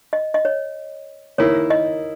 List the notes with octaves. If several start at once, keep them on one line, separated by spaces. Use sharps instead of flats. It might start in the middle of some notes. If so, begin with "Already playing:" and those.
D#5
D#5
C#5
D#3 A#3 E4 C#5
D#5